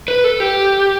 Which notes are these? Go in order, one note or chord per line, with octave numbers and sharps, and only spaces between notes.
B4
A4
G4